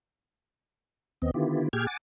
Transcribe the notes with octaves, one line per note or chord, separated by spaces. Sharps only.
D#2 B3 C4 D#5
D3 D#3 B3 E4 F4 G4
A#2 G4 G#4 G5 F6 G#6
F#5 G#5 D6 A6